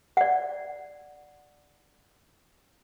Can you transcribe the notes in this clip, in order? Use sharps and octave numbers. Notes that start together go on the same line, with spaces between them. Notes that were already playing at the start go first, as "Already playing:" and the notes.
D5 F#5